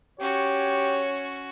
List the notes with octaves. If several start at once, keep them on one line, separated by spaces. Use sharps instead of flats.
C#4 F#4 G4 C#5